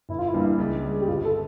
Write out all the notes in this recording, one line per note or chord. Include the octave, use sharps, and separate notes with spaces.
G1 E4
F4
E4
G2 E3 G3 A#3
C#2
C#3 G3
G4
G1 F4
A4